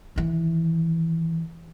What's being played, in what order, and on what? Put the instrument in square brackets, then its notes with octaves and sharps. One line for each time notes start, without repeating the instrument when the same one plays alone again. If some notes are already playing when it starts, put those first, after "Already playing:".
[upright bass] D#3 E3